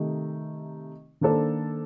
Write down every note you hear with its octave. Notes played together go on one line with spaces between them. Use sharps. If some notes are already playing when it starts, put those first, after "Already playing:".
Already playing: C3 D#3 A3 D#4
D#3 A#3 D4 A4 C5